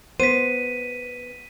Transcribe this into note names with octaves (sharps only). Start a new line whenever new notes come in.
B3 C5 B6 D#7